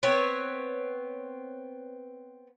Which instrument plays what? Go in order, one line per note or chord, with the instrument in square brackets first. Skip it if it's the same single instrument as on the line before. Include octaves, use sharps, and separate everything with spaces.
[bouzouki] B3 C4 C#5